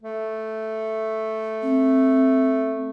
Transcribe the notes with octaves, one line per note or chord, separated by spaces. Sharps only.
A3
C4